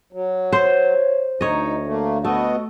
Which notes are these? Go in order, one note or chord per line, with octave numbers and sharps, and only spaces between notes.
F#3
C5 C#5
D2 D#4 C#5 D#5
A3 A#3
A3 B3 F#4 D#5